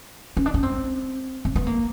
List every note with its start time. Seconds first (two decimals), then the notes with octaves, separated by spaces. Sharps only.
0.37 C#4
0.46 D4
0.54 C#4
0.63 C4
1.45 C4
1.56 B3
1.67 A#3